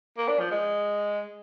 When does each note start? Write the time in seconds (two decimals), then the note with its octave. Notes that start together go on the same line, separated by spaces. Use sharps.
0.18 A#3
0.28 D4
0.40 F3
0.51 G#3